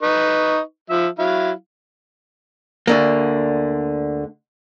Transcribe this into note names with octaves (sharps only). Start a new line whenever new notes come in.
D#4 B4 C#6
F3 E5
F#3 E4 F5
D2 D3 A#3